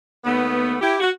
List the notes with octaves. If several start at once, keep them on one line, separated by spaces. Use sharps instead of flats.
D#2 A3 B3
E4 G4
F#4